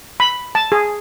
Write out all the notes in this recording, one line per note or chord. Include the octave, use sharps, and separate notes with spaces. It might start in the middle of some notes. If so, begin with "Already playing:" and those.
B5
A5
G#4